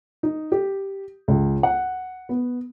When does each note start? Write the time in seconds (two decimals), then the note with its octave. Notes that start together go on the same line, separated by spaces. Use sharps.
0.23 D#4
0.52 G4
1.28 C#2
1.63 F#5
2.29 B3